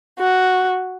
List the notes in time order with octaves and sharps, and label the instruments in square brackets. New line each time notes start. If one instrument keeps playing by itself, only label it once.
[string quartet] F#4